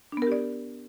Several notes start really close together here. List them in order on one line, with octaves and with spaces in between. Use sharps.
D4 B3 A#4 G4 D5